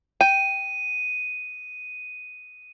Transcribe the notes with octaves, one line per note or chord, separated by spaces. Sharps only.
G5 D#7